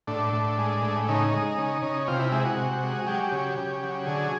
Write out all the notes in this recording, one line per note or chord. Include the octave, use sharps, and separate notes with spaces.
A2 D4
A2
G#3
A2
C#3 D#4
G#3
C#3
C#3
C3 F4
E4
G#3 E4
F#4
C3
G#3
F#3 G4
C#3
C#3
F#3
D3 G#4